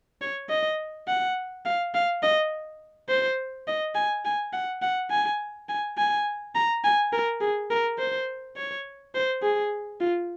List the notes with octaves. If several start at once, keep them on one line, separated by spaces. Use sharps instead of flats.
C#5
D#5
F#5
F5
F5
D#5
C5
D#5
G#5
G#5
F#5
F#5
G#5
G#5
G#5
A#5
G#5
A#4
G#4
A#4
C5
C#5
C5
G#4
F4